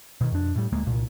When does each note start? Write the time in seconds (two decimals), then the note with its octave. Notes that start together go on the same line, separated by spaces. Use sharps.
0.21 B2 D#3
0.32 F2 D4
0.56 A2 G3
0.72 D1 D2 G#3 A#3
0.86 C2 A#2